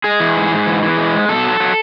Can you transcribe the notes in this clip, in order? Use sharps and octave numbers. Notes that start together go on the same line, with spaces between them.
G#3 G#4
E3
G#2
G#2
E3
E3
G#3
G#2
B2 A4
F#3
F#3